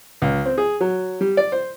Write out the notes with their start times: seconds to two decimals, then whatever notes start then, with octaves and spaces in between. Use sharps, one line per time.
0.22 C#2
0.46 C4
0.58 G#4
0.80 F#3
1.21 G3
1.37 D5
1.52 C5